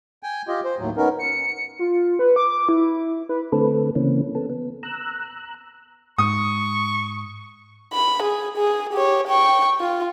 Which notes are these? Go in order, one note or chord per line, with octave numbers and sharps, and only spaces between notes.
G5 G#5
F4 G4 D#5
C5
D#2 A2 F#3
B3 C#4 D#4 A#4
C#7
F4
B4
D6
E4
B4
D3 A3 C4 A4 B4
C#3 E3 A#3 C4 C#4
B3 A4
B3
A#5 E6 F#6
G#2 C#6 D#6
B5
G#4
G#4
G4 C#5
G5 C#6
F4